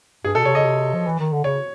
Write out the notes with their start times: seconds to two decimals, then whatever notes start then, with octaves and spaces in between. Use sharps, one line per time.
0.24 G2 G#4
0.35 B2 A4
0.45 C3 C#5
0.55 C#3 D#5
0.65 C3
0.94 F3
1.07 E3
1.20 D#3
1.33 D3
1.44 C#3 C#5